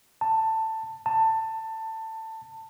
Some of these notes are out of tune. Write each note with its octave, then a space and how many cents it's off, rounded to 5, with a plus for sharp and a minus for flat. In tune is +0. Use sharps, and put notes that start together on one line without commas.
A5 +15
A5 +20